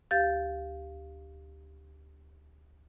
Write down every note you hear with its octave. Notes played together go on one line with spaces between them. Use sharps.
D2 G4 F5 G6 A6